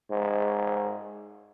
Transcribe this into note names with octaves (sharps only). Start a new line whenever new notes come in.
G#2